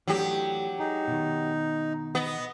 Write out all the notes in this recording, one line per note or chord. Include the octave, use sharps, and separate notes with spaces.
E3 F#3 A3 D4 G4
D#4 G#4
B2 D#3
B3 D#5